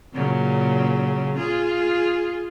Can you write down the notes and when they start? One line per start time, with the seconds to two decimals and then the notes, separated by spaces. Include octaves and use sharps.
0.13 A#2 C#3 F#3
1.37 F4 G#4